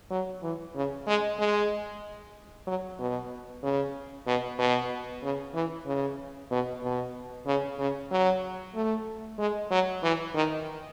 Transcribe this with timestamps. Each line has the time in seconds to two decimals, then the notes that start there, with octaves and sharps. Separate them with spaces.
0.10 F#3
0.43 E3
0.75 C#3
1.07 G#3
1.39 G#3
2.67 F#3
2.99 B2
3.63 C#3
4.27 B2
4.59 B2
5.23 C#3
5.54 E3
5.87 C#3
6.51 B2
6.83 B2
7.46 C#3
7.79 C#3
8.11 F#3
8.75 A3
9.39 G#3
9.71 F#3
10.03 E3
10.34 D#3